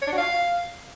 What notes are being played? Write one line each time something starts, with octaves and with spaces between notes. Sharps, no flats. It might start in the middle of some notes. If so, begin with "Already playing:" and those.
C#5
D4
F#4
F5